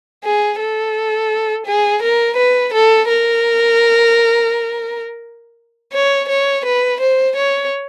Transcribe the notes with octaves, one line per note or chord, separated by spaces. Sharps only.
G#4
A4
G#4
A#4
B4
A4
A#4
C#5
C#5
B4
C5
C#5